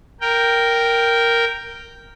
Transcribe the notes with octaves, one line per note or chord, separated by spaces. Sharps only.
A#4 G5